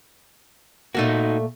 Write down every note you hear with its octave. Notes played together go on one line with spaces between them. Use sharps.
A#2 A3 A#3 D#4 F#4